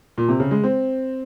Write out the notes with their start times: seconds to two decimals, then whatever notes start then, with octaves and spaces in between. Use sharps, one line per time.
0.18 A#2
0.28 C3
0.40 C#3
0.51 G#3
0.64 C4